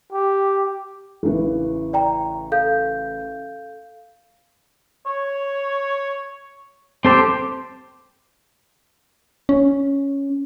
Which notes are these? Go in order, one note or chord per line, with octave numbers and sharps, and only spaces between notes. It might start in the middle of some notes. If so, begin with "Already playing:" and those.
G4
A1 C#3 E3
D5 G5 A#5
A4 F5 G6
C#5
C4 G4 A4 C5
C#4